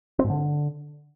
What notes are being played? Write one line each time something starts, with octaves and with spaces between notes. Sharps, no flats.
C4
G#2
D3